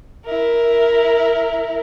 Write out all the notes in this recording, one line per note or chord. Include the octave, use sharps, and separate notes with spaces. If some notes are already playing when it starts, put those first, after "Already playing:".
E4 A#4